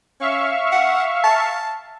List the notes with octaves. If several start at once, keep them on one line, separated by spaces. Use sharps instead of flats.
C#4 E5 F5 C#6
F#5
A5